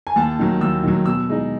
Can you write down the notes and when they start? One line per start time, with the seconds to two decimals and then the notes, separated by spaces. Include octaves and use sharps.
0.07 G#5
0.16 D#2 A5
0.39 D#3 F#3
0.61 D#2 E6
0.83 D#3 F#3
1.06 B2 E6
1.29 G#3 D#4